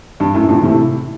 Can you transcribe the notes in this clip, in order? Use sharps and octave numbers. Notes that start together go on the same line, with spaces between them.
G2
F#2 A2
G2 A#2
A2 C3